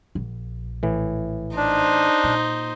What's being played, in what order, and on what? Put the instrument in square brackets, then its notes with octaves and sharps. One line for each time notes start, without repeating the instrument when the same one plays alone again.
[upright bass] A#1
[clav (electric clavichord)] A2 E3
[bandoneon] D4 [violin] D#4 C5
[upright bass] A#2